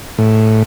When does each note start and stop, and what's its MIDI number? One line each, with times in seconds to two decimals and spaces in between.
0.18 0.63 45